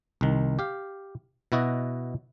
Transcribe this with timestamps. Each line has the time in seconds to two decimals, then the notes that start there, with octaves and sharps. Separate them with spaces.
0.21 C2 D#3
0.59 G4 F5
1.52 B2 E4 F#4 D#5